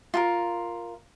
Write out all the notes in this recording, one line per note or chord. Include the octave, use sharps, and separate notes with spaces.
F4 A4 A#4